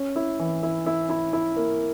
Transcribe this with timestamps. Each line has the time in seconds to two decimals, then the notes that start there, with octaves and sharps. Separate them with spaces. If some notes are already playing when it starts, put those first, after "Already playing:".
Already playing: C#4
0.16 E4
0.39 E3
0.63 E4
0.86 E4
1.10 E4
1.33 E4
1.57 A#3